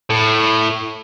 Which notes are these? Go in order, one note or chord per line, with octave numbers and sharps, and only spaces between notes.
A2